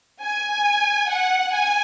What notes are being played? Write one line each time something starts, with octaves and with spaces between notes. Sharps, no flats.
G#5
F#5
G#5